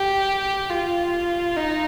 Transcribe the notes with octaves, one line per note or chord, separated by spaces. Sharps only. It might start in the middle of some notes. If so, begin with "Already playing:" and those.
Already playing: G4
F4
D#4